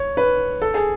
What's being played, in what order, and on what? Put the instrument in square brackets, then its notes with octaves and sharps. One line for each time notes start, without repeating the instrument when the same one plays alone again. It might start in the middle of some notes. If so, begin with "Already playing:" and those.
Already playing: [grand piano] C#5
B4
A4
G#4